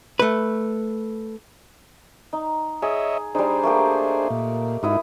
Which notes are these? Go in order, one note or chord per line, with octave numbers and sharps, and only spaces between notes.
A3 B4
D#4
G#4 C#5 D#5 E5
G3 D4 D#4 G#4 C5
A3 A#3 G4
A#2
G#2 D#4 E4 F#4 D#6 E6